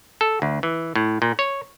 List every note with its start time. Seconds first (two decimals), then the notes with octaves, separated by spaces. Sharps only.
0.21 A4
0.42 D2
0.63 E3
0.96 A2
1.22 A#2
1.39 C#5